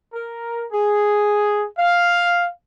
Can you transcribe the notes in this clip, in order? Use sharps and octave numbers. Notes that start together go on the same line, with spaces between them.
A#4
G#4
F5